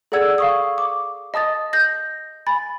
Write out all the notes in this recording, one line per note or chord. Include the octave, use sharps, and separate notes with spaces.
G#4 A4 D5 F#5 E6 G#6
F5 C#6 D#6
D6
D#5 A5 D#6 A6
G6 A#6
G#5 B5 A6